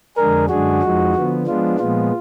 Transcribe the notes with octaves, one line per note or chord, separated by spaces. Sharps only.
F2 D3 G#3 D4 G#4 A#4
F#2 D3 G#3 D4 F#4 G#4
F2 F3 G#3 D#4
D3 F3 B3
F3 G#3 B3 D4 F4
A#2 F3 G#3 B3 F4